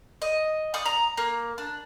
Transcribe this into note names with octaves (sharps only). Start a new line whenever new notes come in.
D#5
D5 C#6 D#6
A#5
A#3
D4